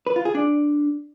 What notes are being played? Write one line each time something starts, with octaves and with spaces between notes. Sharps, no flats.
B4
F4
G#4
D4